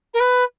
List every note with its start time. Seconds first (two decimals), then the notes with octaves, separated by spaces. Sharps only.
0.14 A#4
0.20 B4